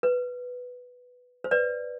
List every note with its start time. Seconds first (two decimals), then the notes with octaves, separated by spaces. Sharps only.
0.03 B4
1.44 C5
1.51 B4 D5